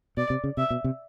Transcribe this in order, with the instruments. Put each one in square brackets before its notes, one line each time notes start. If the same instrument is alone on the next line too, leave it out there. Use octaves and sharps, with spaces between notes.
[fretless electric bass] B2 [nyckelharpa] D5
[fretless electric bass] C3
C#3
[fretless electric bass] C3 [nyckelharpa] E5
[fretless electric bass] B2
C3